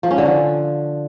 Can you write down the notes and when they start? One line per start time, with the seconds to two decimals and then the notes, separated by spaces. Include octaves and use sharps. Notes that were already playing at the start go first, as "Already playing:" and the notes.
0.03 F3
0.11 C#4
0.18 D3
0.25 F3